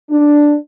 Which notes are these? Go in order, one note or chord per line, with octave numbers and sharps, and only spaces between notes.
D4